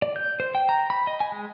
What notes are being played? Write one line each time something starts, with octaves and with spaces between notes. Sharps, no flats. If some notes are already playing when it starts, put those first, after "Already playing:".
D5
G6
C5
G5
A#5
B5
D#5
G#5
G#3